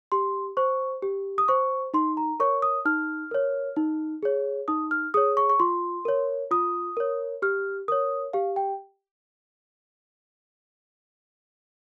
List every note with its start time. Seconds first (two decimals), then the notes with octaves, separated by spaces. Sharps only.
0.12 G4 C6
0.57 C5 C#6
1.03 G4
1.38 D#6
1.48 C5 C#6
1.94 D#4 C6
2.17 A#5
2.40 A#4 C#5 C#6
2.62 D#6
2.85 D#4 F6
3.31 A#4 C#5
3.76 D#4
4.23 G#4 C#5
4.68 D#4 D#6
4.91 F6
5.14 G#4 C#5 D#6
5.37 C#6
5.49 C#6
5.60 F4 C6
6.05 A#4 C#5
6.51 F4 D#6
6.97 A#4 C#5
7.42 G4 F6
7.88 A#4 C#5 D#6
8.33 G4 F5
8.56 G5